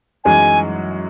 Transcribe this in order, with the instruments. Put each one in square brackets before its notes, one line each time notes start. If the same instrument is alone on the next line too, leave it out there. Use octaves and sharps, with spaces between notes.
[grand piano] F#2 E3 G#3 D#4 [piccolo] G#5